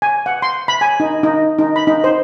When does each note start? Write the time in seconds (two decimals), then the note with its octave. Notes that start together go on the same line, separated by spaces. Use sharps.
0.02 G#5
0.26 F#5
0.42 C6
0.68 B5
0.81 G#5
1.00 D#4
1.23 D#4
1.59 D#4
1.76 B5
1.87 D#4
2.04 C5